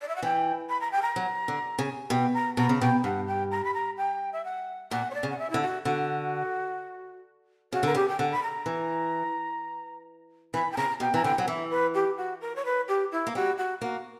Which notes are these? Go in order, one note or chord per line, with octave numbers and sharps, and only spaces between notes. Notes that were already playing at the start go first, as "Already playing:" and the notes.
D5
E5
F#5
E3 G5
B5
A#5
G5
A#5
F#3
D3
C#3
B2 G5
A#5
B2 A#5
C#3
B2 G5
G2 F#5
G5
A#5
B5
A#5
G5
E5
F#5
A#2 F#5
C#5
D5
C#3
F#5
E5
D3 E4
F#4
D3 F#4
C#3 F#4
D3 A#4
C#3 G4
G5
D3 F#5
B5
A#5
E3
E3 B5
G5
C#3 A#5
B2 G5
E3 A#5
D3 G5
F#3 F#5
E3 E5
B4
G4
F#4
A#4
C#5
B4
G4
E4
A#3
G3 F#4
F#4
A#3 F#4